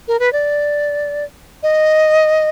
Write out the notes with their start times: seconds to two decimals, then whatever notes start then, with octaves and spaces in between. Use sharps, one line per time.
0.08 A#4
0.20 B4
0.33 D5
1.63 D#5